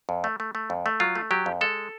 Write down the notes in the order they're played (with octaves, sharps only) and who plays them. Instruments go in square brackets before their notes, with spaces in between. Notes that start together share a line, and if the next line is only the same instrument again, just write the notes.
[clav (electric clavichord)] F2
A3
A3
A3
F2
A3
F#3 F4
A3
F#3 G4
F2
G#3 A4